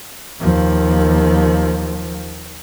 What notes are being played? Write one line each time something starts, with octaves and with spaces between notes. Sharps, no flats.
D#2 F3